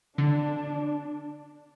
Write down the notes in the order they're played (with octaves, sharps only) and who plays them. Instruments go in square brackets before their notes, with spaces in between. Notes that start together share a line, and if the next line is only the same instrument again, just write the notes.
[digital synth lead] D3 [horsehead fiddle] D4